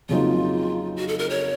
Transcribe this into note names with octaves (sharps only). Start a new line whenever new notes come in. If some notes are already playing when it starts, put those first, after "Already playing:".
F2 C#3 F#3 A#3 D#4 F4
F#4
A4
A#4
C#5